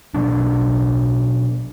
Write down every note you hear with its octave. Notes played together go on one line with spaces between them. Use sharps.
B2 F#3 D4